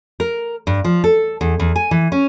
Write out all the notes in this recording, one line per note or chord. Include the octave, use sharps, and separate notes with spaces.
A#4
G2
F3
A4
E2
E2
G#5
E3
C#4